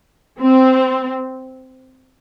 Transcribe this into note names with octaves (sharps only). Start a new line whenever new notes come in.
C4